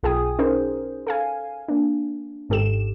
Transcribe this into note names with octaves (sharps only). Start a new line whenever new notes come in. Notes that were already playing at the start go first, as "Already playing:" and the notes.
B1 F4 G#4 G5 G#5 D#6
C#4 D#4 G#4 A#4 C5
A4 F5 G#5
A#3 D4
G#1 G#2 G4 A4 E7